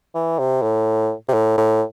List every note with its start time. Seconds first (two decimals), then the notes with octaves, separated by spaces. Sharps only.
0.15 E3
0.38 C3
0.62 A2
1.28 C3
1.34 A2
1.58 A2